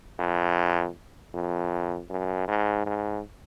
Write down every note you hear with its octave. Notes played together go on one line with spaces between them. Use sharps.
F2
F2
F#2
G#2
G#2